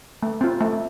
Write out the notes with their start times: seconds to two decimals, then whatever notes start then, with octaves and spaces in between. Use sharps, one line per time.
0.23 A3
0.41 C4 F4
0.61 A3